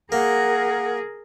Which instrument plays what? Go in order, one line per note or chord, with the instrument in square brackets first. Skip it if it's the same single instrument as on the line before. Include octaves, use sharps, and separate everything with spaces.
[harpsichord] A#3 [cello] G#4 A#4 [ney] F#5